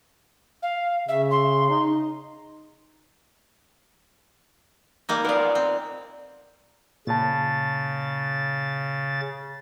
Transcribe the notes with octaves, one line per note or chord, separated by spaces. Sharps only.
F5
C#3 E5
C6
D#4
G3 A#3 D#4
B3 F4 A#4 D5
C4
A#2 C#3 A5 A6